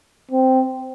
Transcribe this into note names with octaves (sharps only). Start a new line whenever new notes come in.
C4